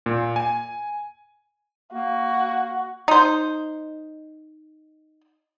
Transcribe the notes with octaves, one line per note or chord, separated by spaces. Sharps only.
A#2
G#5
A#3 F#4
D#4 C5